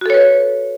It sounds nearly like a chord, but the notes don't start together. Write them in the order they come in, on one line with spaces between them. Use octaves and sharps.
F#4 A4 C#5 B4